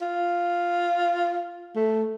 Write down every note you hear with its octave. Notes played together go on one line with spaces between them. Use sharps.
F4
A3